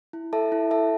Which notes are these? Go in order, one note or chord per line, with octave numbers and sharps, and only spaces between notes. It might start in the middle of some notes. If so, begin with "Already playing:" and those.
E4
A4 E5 A5
E4
A4 E5 A5